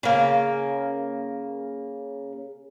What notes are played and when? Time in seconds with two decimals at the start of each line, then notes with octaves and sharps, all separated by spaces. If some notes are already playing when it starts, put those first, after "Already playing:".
0.03 C#3 A#3